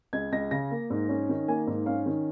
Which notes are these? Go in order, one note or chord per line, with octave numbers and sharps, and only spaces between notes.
C#2 G#6
C#2 A#6
C#3 A#6
A#3
G#2
C#4
D#3
A#3 G#5
G#2
C#4 F5
D#3